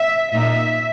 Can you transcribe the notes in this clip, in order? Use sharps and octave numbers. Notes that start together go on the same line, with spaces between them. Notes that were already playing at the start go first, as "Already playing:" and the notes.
Already playing: E5
A#2 A#3 D#4 E5